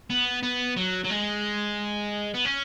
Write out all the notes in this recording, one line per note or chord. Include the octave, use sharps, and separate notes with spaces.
B3
B3
F#3
F#3
G#3
B3
C#4